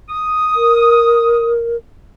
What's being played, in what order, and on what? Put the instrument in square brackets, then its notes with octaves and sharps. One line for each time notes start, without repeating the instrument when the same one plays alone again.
[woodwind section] D#6
[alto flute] A#4